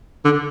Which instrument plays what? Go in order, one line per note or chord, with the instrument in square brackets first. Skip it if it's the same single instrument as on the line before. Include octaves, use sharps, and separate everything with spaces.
[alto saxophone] D3